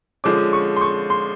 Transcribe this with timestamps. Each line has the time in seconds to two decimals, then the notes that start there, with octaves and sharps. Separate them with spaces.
0.24 D3 F3 G#3 C#4 D6
0.53 C#6
0.76 C6
0.81 C#6
1.10 C6